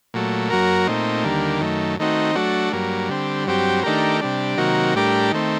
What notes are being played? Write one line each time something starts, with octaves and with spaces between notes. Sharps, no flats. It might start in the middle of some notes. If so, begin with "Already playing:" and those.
A#2 F#3 A3
F#2 F#3 A#3 F#4 A#4
A#2 A3 C4 D#4
D#2 D3 G3 A#3
F#2 D#3 A3
D#3 A3 C4 D#4 F#4
F#3 A3 D4 F#4
G2 F#3 A#3
D3 G3 C4
G2 F#3 C4 G4
D#3 A3 D4 G4 A#4
C3 G3 D4
C3 D#3 F#3 A#3 F#4
A2 G3 D4 G4 A#4
D#3 A3 C4